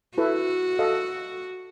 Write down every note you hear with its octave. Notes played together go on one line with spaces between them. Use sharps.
E4 F#4 A4 B4
A4 D#5 F5